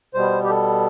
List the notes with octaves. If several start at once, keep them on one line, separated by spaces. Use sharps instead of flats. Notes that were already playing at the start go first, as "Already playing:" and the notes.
B2 G3 B3 C5
G4
A4